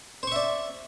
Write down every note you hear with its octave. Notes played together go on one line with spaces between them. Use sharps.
C5 D5 E5 C#6